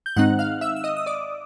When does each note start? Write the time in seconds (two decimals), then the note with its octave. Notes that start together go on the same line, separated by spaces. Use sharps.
0.06 G6
0.16 G#2 D#3 G#3 C4 D#4 F#5 F#6
0.39 F5 F6
0.61 E5 E6
0.76 E6
0.84 D#5 D#6
0.97 D#6
1.06 D5 D6